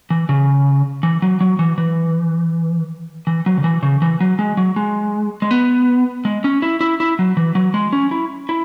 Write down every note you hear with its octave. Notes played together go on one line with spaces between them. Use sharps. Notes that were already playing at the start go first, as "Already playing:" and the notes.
E3
C#3
E3
F#3
F#3
E3
E3
E3
F#3
C#3
E3
C#3
E3
F#3
G#3
F#3
G#3
G#3
B3
G#3
C#4
E4
E4
E4
F#3
E3
F#3
G#3
C#4
E4
E4